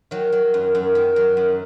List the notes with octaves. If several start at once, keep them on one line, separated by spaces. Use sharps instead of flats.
D#3 F#3
F#3
F#2
F#2
D#3
F#3
F#2